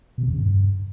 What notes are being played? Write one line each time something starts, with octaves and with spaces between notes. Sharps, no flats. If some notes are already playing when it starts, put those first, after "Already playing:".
B2
C3
E2
C#3
G2